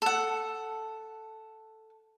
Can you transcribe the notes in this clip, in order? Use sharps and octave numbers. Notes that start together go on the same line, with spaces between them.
A4 F#5